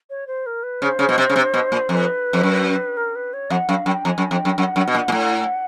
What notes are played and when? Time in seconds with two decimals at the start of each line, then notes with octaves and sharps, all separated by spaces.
0.10 C#5
0.27 C5
0.46 A#4
0.63 B4
0.82 C#3 C5
0.99 C#3
1.09 B2
1.18 C3
1.30 C#3
1.36 C3
1.54 B2
1.72 A#2
1.89 F2 C5
1.95 B4
2.33 F2
2.43 F#2
2.97 A#4
3.15 B4
3.33 C#5
3.50 F2 F#5
3.69 F#2 F5
3.86 F#2 G5
4.05 F2 A#5
4.09 G#5
4.18 F#2
4.31 F2 G5
4.45 F#2
4.58 F#2 F#5
4.76 F#2
4.88 B2
4.95 A#2
5.08 A#2
5.12 A2